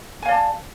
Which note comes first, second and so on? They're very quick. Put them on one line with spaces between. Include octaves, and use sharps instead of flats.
G#5 F5 D5 A5